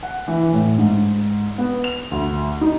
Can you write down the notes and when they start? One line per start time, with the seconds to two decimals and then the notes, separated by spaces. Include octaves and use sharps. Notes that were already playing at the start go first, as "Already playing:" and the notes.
0.03 F#5
0.28 E3
0.53 A2
0.78 G#2
1.58 B3
1.84 F7
2.11 D2
2.61 D#4